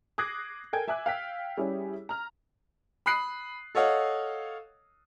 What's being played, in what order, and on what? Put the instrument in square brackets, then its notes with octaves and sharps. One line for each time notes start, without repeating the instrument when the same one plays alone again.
[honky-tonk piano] D6 D#6 F#6 G#6 A#6 C7
A4 A#4 G5 G#5 G#6
E5 G#5 D6 E6 F#6
F5 G5 B6
G3 C#4 E4 G4 G#4
A#5 F6
[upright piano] B5 D#6 F#6 C7
A4 C#5 D#5 F5 F#5